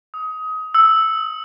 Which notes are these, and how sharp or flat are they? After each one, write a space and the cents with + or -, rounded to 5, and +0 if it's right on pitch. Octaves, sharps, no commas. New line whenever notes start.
D#6 +25
E6 -5